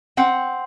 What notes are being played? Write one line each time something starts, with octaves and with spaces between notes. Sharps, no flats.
C4 F#5